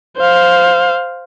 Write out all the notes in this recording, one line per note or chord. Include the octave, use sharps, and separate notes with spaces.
C5 F5